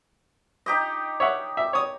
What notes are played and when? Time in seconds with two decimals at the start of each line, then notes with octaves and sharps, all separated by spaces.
0.66 D#4 G4 D#5
1.20 C#5 E5 F#5
1.57 E5
1.73 C#5 D#6